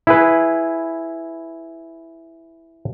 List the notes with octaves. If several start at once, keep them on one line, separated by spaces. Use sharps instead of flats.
E4 G#4 B4